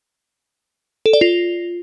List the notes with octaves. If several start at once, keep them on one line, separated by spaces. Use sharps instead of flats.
A4
D5
F4